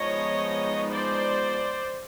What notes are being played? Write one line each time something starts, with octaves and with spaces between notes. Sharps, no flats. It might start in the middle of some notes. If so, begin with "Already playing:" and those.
Already playing: F3 G#3 B3 D#4 C#5 D#5
C5 D5